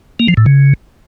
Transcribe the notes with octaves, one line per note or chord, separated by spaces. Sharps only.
A#3
F3
A2
C#3